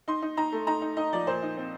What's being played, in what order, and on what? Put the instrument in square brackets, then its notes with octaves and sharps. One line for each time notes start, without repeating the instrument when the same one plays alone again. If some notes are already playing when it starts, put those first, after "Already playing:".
[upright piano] D#4 C6
D#4
D#4 A#5
A3
D#4 A#5
D#4
D#4 D#5
F3 D5
A#2 C5
D#4
C4